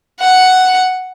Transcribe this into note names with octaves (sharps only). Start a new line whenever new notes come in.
F#5